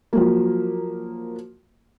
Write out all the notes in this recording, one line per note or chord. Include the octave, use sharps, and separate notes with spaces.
F3 F#3 A#3